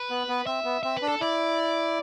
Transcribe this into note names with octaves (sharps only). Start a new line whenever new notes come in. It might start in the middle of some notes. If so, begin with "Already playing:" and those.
Already playing: B4
B3
B3
C4 E5
B3
C4 E5
B4
D4
A4
E4 D5